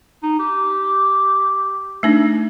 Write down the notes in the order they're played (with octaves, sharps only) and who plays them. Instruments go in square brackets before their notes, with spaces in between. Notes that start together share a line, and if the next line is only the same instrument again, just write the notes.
[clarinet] D#4
G4
[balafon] A3 D4 D#4